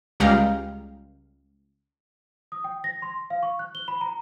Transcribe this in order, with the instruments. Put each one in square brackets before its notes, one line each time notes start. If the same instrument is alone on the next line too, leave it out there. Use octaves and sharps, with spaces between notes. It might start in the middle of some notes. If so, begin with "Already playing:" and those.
[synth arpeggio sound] C#2 G3 G#3 F5 G5 A#5
[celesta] D#6
G5
A#6
C6
F5
C#6
F#6
G7
B5
A#5